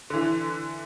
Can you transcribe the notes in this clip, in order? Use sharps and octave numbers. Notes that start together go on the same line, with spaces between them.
D3 E3